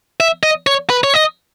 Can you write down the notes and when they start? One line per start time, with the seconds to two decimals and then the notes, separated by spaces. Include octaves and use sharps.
0.20 E5
0.43 D#5
0.67 C#5
0.90 B4
1.04 C#5
1.14 D#5